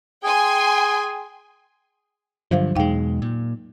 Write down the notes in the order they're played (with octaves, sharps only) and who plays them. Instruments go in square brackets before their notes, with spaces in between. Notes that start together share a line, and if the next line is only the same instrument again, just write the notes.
[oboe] G#4 [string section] G5 G#5 C6
[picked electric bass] G2 D3 F3 [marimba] F#3 C5 F5
[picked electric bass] E2 B2 G#3 [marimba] D#4 F5 G5
[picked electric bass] A#2